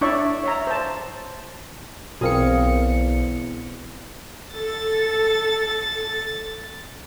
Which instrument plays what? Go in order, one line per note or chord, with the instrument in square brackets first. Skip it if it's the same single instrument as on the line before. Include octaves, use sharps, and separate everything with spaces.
[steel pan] D4 E4 C#5 D5 E5 C#6
C#5 E5 A#5
C5 A5
[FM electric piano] B1 C4 C#7 [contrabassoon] E2 [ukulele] G#4 A#4 F5
[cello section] A4 [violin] A6